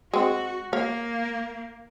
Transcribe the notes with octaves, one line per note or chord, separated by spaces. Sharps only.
G#3 C4 F#4
A#3 C#5 F5